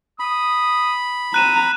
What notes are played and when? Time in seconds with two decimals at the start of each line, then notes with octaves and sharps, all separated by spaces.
0.19 B5 D#6
1.34 C4 A#5 F#6 D#7 E7